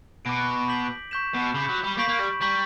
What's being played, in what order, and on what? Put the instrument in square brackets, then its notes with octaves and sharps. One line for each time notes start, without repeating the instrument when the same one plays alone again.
[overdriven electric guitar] B2 [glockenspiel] D6 A#6 D7
[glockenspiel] D6 G6 B6 F#7
C#6 G6 B6 E7
[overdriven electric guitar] B2
[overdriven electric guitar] C#3 [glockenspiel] B5 D6 G6 B6
[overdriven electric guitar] F#3
G3
[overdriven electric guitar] A#3 [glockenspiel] C#6 G6 B6 D7 F#7
[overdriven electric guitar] A#3
G3
[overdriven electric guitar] G3 [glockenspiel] A#5 C#6 G6 B6 F#7